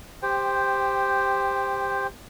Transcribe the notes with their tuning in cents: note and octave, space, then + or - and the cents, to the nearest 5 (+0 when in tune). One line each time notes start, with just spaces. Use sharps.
G4 +15 C5 +0 G5 +0